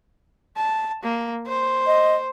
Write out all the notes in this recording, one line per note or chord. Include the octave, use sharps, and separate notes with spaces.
A5
A#3
C5
D#5